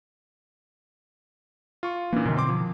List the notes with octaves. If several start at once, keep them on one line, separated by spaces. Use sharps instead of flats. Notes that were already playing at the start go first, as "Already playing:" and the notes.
F4 C#6
A#2 E3 A#3 C#4 D4
F#2 B2 D3 D#3
C4 C6 D6
F3